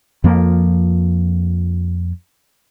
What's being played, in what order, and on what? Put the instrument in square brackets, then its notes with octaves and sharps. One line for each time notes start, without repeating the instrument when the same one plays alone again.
[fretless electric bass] F2 F3 A#3